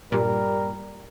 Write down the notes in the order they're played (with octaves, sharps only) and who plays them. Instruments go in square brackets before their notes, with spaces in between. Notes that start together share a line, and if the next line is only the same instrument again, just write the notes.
[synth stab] G2 A#2 [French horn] G3 [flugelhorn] A#4